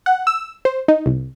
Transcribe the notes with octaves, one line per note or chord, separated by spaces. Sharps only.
F#5
E6
C5
D#4
C2